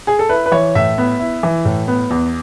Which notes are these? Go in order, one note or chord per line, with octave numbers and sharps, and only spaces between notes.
G#4
A4
E4 B4
B4
E3 C#5
A2 E5
B3
E4
E3
A2
B3
E2